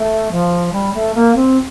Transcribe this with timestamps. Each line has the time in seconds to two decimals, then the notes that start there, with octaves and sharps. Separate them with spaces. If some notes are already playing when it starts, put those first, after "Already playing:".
Already playing: A3
0.31 F3
0.72 G3
0.94 A3
1.14 A#3
1.35 C4